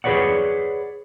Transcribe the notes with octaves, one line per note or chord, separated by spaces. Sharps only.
G#4 B4 C#5 D5 F#5